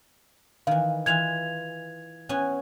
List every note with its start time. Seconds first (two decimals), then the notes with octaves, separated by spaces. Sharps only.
0.67 D#3 E3 F5
1.06 E3 F4 E5 G#6 F7
2.29 B3 C#4 G#5